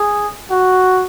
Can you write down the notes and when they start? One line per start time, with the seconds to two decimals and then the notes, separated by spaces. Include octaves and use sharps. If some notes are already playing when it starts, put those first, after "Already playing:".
Already playing: G#4
0.50 F#4